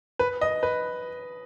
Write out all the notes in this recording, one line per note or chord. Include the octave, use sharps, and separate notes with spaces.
B4
D#5
B4